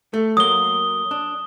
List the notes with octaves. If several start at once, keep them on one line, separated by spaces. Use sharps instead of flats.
A3
F#3 A#3 D#6 G7
D4